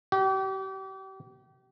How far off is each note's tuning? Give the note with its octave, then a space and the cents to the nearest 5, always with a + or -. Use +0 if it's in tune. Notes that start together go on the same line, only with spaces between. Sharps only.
G4 -35